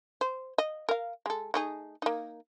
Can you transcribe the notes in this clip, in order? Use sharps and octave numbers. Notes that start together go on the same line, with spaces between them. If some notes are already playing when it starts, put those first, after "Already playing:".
C5
D#5
A#4 F5
G#3 A4
A3 D#4 G#4
A#3 D#4